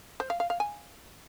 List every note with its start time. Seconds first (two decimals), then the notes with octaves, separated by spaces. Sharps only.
0.20 C5
0.30 F5
0.40 F5
0.50 F5
0.60 G#5